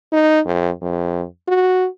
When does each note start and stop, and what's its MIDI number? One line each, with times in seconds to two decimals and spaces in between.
0.12 0.40 63
0.45 0.70 41
0.82 1.24 41
1.48 1.87 66